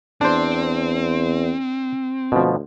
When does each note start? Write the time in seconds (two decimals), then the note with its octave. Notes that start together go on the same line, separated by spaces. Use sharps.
0.21 E2 C4 D4 C5
2.32 D2 B2 F3